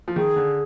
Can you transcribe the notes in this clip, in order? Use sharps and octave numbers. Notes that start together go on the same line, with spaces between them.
F3
D#3 G#4
D3